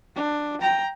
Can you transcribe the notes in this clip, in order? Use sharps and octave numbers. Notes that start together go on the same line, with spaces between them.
D4
G5 A#5